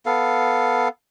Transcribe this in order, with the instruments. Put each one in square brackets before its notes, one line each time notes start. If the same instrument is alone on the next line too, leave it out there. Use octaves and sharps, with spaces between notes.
[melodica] B3 A4 F5